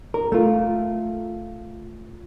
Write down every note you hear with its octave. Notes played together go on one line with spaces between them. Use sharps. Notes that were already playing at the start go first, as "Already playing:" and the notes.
A#4
A3 F4